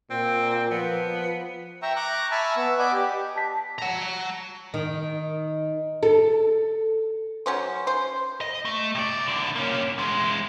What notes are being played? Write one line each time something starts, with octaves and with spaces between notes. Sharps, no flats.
A#2 C4
F3 B3
E5 G5 A#5 C#6 E6
A#5 C#6 D6 F#6
E5 G#5 A5 B5 C#6 F6
B3 E6
D5 D#5 F#5 G#5 B5 D6
G4
A5 B6
F#5 A#5
D#3
A4
F#3 C#4 C5
C5
D#5
A3
C3 D5
C2 D3
A#3 C#4
E2 G#3